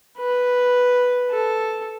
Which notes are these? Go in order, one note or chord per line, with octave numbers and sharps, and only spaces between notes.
B4
A4